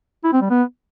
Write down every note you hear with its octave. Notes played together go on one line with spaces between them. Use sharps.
E4
C4
G3
B3